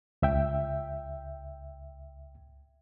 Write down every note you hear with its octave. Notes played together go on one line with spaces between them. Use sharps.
C#2 E5 G5